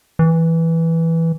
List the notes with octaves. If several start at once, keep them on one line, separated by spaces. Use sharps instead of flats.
E3